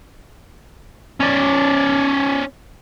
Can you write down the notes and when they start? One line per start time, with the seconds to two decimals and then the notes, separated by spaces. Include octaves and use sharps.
1.20 C#4 D5